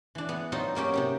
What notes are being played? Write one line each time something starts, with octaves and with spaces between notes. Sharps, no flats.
E3 D4
B3
F#3 C4 D#4 F4
F#3 A#3 C#4 G4
C3 D#4 G4